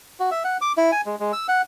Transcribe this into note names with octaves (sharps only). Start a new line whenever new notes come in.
F#4
E5
F#5
D6
E4
G#5
G#3
G#3
E6
F#5